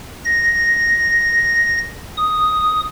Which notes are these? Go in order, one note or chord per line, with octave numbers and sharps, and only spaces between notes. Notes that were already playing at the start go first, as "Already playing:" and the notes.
A#6
D#6